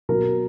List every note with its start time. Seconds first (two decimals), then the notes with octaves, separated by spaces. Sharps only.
0.09 B2 F#3 A#4